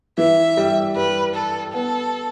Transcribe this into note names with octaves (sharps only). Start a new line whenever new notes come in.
E3 E5
G3
G3 B4
A4
B3 A4